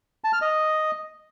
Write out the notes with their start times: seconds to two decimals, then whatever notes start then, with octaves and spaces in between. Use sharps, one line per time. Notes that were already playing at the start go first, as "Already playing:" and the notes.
0.24 A5
0.33 F6
0.42 D#5